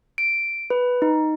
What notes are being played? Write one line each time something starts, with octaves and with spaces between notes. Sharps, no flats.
D7
B4
D#4